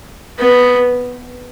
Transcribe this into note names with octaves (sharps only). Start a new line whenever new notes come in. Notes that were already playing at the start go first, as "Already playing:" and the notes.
B3